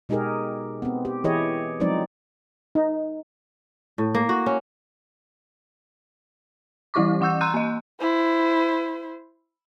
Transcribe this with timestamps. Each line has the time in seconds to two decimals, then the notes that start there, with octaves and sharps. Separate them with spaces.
0.09 B2 G#3 D#4 G4 G#4 A#4
0.82 B3 C4
1.05 G4
1.24 E3 E4 G4 G#4 C#5 D#5
1.80 F3 F#3 G#3 C4 D#4 D5
2.75 D#4
3.98 A2
4.14 A#3
4.29 F#4
4.46 C#4
6.94 E3 G3 E4 G4 C#6 D6
7.21 E3 F#5 C#6 E6 G6
7.41 A#5 C6 E6 F#6 G6 D#7
7.54 A#3 D#5
8.00 E4 C5